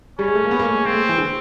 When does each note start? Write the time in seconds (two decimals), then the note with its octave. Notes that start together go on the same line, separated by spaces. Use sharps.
0.19 G3 C#4
0.27 G#3
0.35 A3
0.44 A#3
0.51 B3
0.59 A#3
0.68 A3
0.76 G#3
0.85 A#3 C4
0.94 A3
1.01 G#3
1.09 E3
1.18 D3